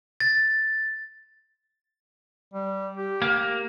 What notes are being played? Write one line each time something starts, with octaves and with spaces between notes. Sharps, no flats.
A6
G3
G4
A#3